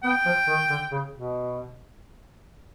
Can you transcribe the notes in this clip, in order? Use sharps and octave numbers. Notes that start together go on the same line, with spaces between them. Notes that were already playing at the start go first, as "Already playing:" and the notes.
B3 G5
F3
D#3
D3
C#3
B2